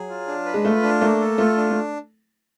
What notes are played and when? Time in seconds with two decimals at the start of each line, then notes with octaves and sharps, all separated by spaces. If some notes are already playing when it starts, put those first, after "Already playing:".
Already playing: F#3 G#4
0.09 F4
0.27 D4
0.46 B4
0.54 G#3
0.65 A3 F4
0.83 D4
1.01 A3 A#3
1.21 A4
1.38 A3 F4
1.57 D4
1.71 A3